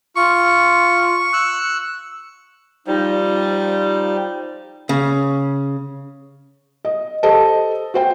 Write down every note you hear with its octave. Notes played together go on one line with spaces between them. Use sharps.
F4 C#6
E6 F#6
F3 G3 D#4
C#3
D#5
G4 A4 C5 D#5 A5
F#4 C5 G5